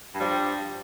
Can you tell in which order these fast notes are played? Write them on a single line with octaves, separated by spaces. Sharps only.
G2 G3 F3